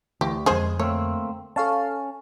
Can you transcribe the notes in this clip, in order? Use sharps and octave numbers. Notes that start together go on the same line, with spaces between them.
D2 E3 G4
F2 D3 G#3 G#4 C5
A3 A#3 C4 C#5
C#4 A4 F5 A5